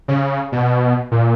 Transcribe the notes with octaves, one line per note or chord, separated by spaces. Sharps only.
C#3
B2
A#2